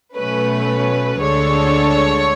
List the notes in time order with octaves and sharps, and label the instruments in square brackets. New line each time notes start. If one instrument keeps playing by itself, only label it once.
[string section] B2 F#3 A3 C#4 [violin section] B4
[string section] D2 D3 G#3 D4 A4 [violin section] C#5